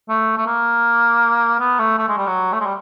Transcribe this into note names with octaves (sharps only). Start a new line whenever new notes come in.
A3
A3
A#3
B3
A3
A3
G#3
G3
F#3
A3
G#3
G3